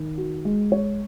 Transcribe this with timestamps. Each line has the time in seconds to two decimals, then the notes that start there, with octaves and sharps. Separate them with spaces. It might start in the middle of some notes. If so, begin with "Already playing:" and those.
Already playing: D#3
0.18 F#4
0.45 G#3
0.72 C#5